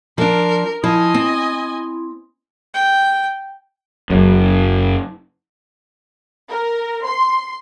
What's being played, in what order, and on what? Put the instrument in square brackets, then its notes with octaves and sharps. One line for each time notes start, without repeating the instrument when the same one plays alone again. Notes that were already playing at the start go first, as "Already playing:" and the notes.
[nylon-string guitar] F3 D4 [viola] A#4
[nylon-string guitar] F3 [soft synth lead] E4 [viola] D#5 G#5
[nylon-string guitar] C4
[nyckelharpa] G5
[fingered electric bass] F#1 F#2
[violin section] A#4
C6